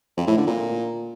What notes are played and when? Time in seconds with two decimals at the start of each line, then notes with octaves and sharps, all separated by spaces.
0.17 F2
0.27 A2
0.37 D3
0.47 A#2